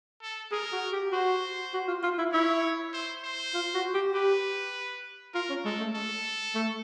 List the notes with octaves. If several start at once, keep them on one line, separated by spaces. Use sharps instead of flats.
A4
G#4 A#4
F#4
G4
F#4 C5
F#4
F4
F4
E4
E4 C#5
C5
C5
F4
F#4
G4
G4 B4
F4 A#4
C#4
G#3 A4
A3
A4
A3